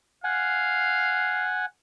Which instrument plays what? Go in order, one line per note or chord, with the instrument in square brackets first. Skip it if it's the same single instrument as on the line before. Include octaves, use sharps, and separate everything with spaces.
[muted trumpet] F5 [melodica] F#5 G#5